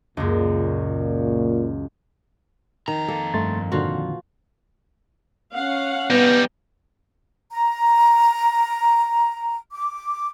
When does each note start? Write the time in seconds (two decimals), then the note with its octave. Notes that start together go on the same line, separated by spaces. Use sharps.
0.17 C#2 F#2 A#2
2.88 F2 D#3 A#5
3.08 A#3 A4
3.34 G2 A3 C6 A6
3.72 A#2 D3 D#3 F3 F4 F#4
5.55 C#4 F5 F#5
6.10 G3 B3 D#4
7.52 A#5
9.72 D6